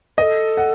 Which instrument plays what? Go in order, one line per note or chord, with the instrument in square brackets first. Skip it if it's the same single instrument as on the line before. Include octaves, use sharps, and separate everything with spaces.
[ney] A4 B4 [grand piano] D#5
[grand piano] F#5